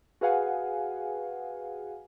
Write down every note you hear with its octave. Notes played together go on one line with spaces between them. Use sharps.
F#4 G#4 B4 F5 F#5 G#5